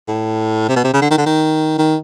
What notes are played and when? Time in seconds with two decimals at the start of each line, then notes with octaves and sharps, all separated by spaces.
0.08 A2
0.69 C3
0.76 B2
0.84 C3
0.94 C#3
1.02 D3
1.11 D#3
1.18 D3
1.26 D#3
1.79 D#3